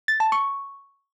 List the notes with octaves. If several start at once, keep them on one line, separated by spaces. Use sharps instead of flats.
A6
A5
C#6